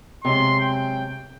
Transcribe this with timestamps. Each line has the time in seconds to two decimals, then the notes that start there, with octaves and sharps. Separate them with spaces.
0.25 C3 F#3 G#3 C6
0.61 G5